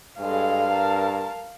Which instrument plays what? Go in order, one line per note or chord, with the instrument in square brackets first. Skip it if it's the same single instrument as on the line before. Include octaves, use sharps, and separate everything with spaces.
[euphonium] G2 [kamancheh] G#3 A4 [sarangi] F5
[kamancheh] A#4 A5